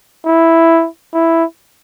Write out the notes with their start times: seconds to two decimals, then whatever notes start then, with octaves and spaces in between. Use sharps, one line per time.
0.26 E4
1.14 E4